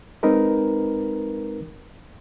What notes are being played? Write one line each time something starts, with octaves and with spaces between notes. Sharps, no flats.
G#3 C4 D#4 A#4 B4